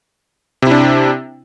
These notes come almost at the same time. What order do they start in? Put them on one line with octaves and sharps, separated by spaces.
C3 E4 D4